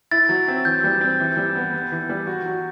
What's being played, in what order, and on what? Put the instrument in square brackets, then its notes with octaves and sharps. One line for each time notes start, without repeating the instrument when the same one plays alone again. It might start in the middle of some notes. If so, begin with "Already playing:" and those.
[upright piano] E4 [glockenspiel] A6
[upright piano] F#3
C4
[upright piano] E3 [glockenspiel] G6
[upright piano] G3
C4
E3
G3
B3
B3
E3
G3
F#4
F#3